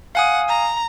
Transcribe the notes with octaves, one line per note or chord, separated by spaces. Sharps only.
F5 F#5 G#5 D#6
A#5